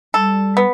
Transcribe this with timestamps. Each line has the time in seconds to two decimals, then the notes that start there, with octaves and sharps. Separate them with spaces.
0.14 G3 A4
0.57 B3